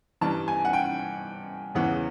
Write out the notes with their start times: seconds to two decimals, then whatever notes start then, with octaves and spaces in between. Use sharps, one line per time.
0.21 G2 E3 A5
0.48 G#5
0.65 F#5
0.73 G5
1.75 E2 C#3 E3 F#5